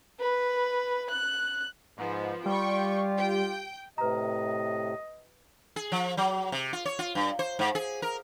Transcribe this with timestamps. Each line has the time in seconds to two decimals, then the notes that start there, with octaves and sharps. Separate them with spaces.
0.20 B4
1.10 F#6
1.98 G#2 F3 B3
2.46 G3 F4 G4 G5 C#6
3.17 G5
3.98 A2 C3 B4 D#5 A#5
5.76 G#4
5.92 F3
6.17 F#3
6.52 C3
6.73 F4
6.85 C#5
6.99 F4
7.15 G2
7.39 C5
7.59 G#2
7.75 G#4
8.02 A#4